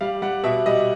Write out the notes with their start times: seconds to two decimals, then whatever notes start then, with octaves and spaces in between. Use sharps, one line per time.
0.01 G3 F5
0.22 G3 F#5
0.44 B2 E5
0.66 G3 D#5